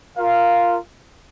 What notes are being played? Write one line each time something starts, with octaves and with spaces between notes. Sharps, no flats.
F4 A#4 F5